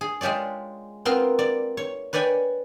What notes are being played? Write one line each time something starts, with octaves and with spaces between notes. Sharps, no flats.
G#4
G#3 F4 G4 C#5 D5
B3 C4 F4 A#4
D5
C#5
B4 C#5 D5 G5 G#5